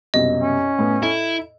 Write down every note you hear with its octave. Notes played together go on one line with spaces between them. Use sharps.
C2 F#2 B2 D#5
C#4
A2 B3
E4 A4